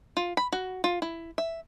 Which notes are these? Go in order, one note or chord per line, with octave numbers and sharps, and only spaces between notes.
F4
B5
F#4
F4
E4
E5